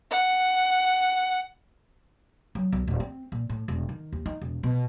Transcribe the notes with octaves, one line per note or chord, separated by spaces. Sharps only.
F#5
F#3
B1
D#1
C4
A#2
A2
E1
D#3
D#2
D#4
E1
B2